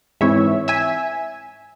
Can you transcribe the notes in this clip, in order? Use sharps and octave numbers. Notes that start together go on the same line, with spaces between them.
G#2 E3 C4 C#5 E5
E5 G#5